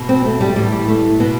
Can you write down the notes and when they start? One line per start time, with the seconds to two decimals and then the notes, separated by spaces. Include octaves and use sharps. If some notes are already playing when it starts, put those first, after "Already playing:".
Already playing: B2
0.09 C4
0.25 A3
0.41 G3
0.56 A2 E3 G3
0.72 G3
0.88 A3
1.20 B2 B3